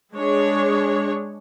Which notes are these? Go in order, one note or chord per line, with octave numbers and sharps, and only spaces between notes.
G#3 D4 G#4 C#5